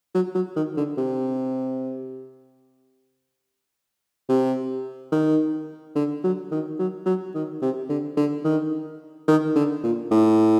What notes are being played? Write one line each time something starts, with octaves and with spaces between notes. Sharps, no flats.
F#3
F#3
D#3
D3
C3
C3
D#3
D3
F#3
D#3
F#3
F#3
D#3
C3
D3
D3
D#3
D#3
D3
A#2
A2